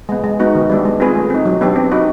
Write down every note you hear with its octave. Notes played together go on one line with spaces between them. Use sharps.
G#3 B3
G#3
B3 D#4 F#4
D#3
G3 B3 D4
G#3
C4 F4 G#4 B4
A3
C4 D#4
F#3
B3 D4 G4
C4
D#4 F#4 B4